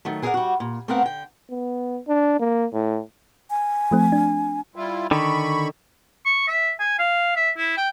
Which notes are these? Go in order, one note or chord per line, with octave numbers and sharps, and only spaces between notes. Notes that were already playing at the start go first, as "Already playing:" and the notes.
D#3 F#3 A3
E4 G#4 A#4 B4 D5 F#5
G3 F#4
A#2
A3 B3 C4 A#4 F5 F#5
D3 G5
B3
D4
A#3
A2
G#5
F3 A3 C4
D4
G3 E4 F4
D3 D#3 B5 C#6
C#6
E5
G#5
F5
E5
E4
G5